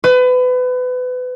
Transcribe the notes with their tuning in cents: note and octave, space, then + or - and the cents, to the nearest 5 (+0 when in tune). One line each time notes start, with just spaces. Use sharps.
B4 +30